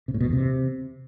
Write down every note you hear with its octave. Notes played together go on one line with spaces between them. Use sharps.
C3
A2
B2
E2
C3